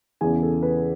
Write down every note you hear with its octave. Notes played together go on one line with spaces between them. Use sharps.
E2 C#3 E3 G#4 G#5
A4
B4